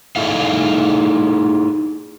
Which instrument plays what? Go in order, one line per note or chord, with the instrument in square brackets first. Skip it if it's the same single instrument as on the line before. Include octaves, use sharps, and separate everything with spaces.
[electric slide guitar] D#4 E4 G#4 A4 F5